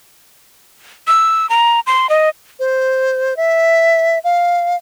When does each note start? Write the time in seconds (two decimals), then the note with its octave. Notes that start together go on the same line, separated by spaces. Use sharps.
1.07 E6
1.50 A#5
1.87 C6
2.10 D#5
2.59 C5
3.37 E5
4.24 F5